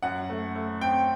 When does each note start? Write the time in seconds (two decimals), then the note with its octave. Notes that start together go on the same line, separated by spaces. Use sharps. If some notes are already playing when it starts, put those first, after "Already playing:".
0.03 F#2 F#5
0.30 A3
0.56 A3
0.81 C4 G5